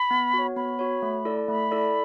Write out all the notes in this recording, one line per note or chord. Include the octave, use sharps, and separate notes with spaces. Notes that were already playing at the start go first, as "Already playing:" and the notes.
Already playing: B5
B3
F#4
C#5
B3 B5
F#4 C#5
A3
E4 A4 D5
A3 B5
E4 A4 D5